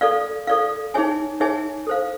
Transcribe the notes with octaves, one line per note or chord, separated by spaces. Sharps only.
A4 D5 F5
A4 D5 F5
D#4 G#4 C#5 E5 G#5
D#4 G#4 C#5 E5 G#5
A4 C5 F5